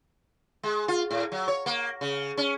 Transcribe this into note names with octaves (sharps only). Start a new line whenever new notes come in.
G#3
F4
A2
F#3
C#5
A#3
C#3
C#4